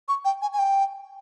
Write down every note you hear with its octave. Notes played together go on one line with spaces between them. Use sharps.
C#6
G5
G#5
G#5
G5